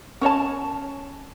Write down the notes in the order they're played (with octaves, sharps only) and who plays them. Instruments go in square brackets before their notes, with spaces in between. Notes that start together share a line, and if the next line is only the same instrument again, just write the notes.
[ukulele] C#4 C#5 D#5 A5